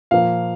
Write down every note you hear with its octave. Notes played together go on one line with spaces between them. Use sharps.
A#2 F3 A#3 F5